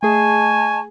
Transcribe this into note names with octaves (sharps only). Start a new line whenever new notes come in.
A3 G#4 D#5 G#5 A5 C#6